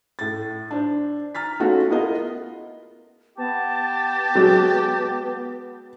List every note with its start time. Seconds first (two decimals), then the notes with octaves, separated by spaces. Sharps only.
0.19 A2 A6
0.71 D4 C5
1.35 A#5 F6 A6 B6
1.60 A3 B3 C#4 D#4 F4 F#4
1.91 B3 E4 F4 A#4 D#5 F5
3.38 B3 G4 A5
4.35 F#3 G#3